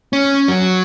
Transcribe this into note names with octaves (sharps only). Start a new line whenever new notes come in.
C#4
F#3